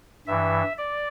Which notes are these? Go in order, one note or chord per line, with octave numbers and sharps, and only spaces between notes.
G2 E3 E5
D5